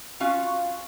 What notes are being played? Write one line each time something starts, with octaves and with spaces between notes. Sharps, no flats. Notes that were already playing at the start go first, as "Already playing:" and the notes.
C#4 F4 F#4 F5